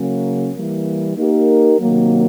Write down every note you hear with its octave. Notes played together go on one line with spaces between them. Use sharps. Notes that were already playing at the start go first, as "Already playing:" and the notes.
Already playing: C#3 F#3 A#3 C#4
E3 G3 A#3
A#3 D#4 G4 A#4
C3 D#3 F#3 A#3